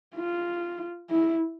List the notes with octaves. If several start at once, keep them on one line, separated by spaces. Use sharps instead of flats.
F4
E4